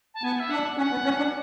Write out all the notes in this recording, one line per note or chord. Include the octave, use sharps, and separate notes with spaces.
A5
B3 G#5
E5
D4 F#5
C#4 F#5
B3
C#4
D4